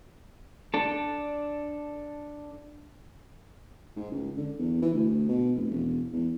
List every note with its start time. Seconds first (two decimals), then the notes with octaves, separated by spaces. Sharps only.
0.74 D4 A4
3.96 G#2
4.12 C#2
4.37 D3
4.59 E2
4.82 E3
4.94 D2
5.29 B2
5.56 F1
5.71 E1
6.13 E2